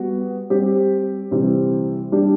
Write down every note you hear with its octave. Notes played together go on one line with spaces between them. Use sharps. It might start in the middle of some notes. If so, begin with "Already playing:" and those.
Already playing: G3 B3 F#4
G3 C4 G4
C3 E3 G3 C4
G3 D4 G4